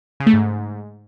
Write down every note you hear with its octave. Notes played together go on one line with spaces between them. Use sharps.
C#3
A3
G#2